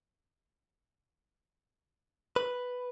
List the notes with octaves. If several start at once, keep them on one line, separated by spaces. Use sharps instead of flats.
B4